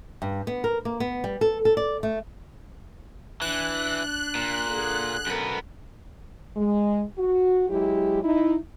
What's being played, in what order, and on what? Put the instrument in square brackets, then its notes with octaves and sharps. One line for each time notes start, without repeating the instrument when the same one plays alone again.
[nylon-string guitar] G2
B3
A#4
A#3
B3
G3
A4
A4
D5
A3
[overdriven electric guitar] E3 [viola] D4 [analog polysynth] F#6
[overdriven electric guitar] A#2
[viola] D3 G#4
[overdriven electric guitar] F#2 B3 [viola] A4 A#4
[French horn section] G#3
F#4
F#3 G#3 E4 G4
D#4 E4